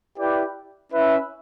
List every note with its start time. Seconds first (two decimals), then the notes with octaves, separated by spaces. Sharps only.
0.17 E4 G4 B4 D5 G5
0.91 C#4 E4 B4 E5